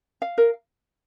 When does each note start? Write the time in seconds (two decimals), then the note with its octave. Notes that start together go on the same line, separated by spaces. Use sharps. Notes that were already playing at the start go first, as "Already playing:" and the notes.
0.22 F5
0.38 A#4